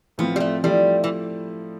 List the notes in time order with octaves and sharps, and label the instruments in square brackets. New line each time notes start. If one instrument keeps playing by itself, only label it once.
[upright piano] A2 F3 C4 F4 [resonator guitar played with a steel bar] B3
[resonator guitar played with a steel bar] G3
A3
[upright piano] F3 A3 E4 [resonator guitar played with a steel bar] G3
[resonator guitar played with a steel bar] E3